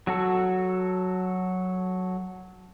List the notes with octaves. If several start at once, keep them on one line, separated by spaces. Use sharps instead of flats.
F#3 F#4 A4